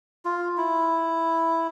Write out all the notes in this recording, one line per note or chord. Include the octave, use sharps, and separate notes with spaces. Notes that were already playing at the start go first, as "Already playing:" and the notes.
F4
E4